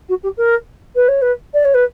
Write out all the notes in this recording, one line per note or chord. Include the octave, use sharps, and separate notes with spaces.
F#4
G4
A#4
B4
C#5
B4
D5
C#5
B4